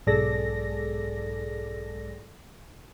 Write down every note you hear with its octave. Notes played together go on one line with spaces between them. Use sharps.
B1 G#2 G#4 A4 D5 A#6